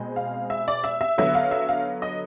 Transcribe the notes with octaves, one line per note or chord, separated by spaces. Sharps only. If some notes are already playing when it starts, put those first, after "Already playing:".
Already playing: B2 G#3 C4
F5
E5
D5
E5
E5
D3 F#3 B3 E5
F5
E5
F5
D#5